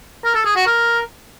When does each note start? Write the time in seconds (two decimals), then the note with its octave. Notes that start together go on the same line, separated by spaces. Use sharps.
0.24 A#4
0.35 A4
0.45 G#4
0.56 F#4
0.66 A#4